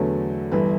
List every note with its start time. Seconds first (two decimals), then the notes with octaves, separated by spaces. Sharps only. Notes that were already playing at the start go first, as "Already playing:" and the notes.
Already playing: E2 D3 F#3 A3 B4
0.52 G1 G2 E3 B4